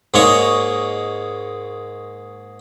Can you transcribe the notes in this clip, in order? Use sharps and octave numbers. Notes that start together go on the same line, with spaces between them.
G#2 G#3 A#3 C#5 D#5 C#6